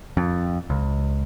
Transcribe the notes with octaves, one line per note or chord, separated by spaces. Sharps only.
F2
C#2